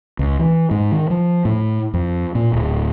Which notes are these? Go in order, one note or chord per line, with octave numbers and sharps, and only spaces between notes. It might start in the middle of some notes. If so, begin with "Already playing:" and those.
C#2
E3
G#2
D#3
F3
A2
F2
A#2
D1